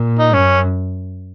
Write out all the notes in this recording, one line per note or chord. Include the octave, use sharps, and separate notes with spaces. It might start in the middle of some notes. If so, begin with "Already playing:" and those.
Already playing: A#2
D#4
F#2 C#4